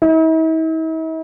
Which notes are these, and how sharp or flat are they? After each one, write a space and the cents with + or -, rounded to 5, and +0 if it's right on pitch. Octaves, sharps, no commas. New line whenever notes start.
E4 -45